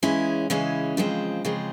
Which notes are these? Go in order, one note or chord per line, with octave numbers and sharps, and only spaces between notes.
C#3 E3 G#3 C#4 E4
C#3 E3 G#3 C#4 E4
C#3 F3 G#3 C4
C#3 F3 G#3 C4